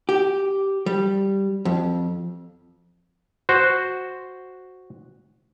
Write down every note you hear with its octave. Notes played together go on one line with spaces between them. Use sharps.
G4
G3
F2
F#4 C5